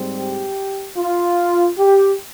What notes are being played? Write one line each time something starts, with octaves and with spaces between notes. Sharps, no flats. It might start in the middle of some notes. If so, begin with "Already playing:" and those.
Already playing: G#2 G3 C4
G4
F4
G4